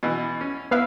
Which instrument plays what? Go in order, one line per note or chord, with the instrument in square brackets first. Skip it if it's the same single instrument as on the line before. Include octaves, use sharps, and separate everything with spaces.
[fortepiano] B2 E3
C#4
[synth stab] B3 B4 F5 [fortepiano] E4 E5